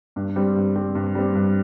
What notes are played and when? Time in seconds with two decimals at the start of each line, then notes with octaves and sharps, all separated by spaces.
0.16 G2
0.36 G3 C4
0.56 G2
0.76 G3 C4
0.95 G2
1.15 G3 C4
1.35 G2